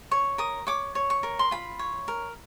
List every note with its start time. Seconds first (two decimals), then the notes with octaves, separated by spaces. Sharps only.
0.11 C#5 C#6
0.38 A#4 D#6
0.67 C#5 D6
0.95 C#5
1.10 C#6
1.23 A#4
1.39 C6
1.51 F4 B5
1.79 C#5
2.08 A#4